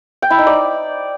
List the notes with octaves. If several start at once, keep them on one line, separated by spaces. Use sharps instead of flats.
G5
E4
D#4
D5